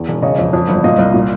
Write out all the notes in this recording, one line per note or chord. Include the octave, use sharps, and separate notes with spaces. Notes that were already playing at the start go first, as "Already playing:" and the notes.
Already playing: E2
E1
C#3 C#5 D#5
F2
F2
G1
A#2 D#5 F5
C2
A#2